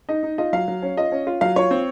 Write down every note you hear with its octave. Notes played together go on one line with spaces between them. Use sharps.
D#4 D#5
D#4
F4 D#5
F#3 F5
F#3
C#4
F4 D#5
C#4
F4
F#3 F5
F4 C#5
C4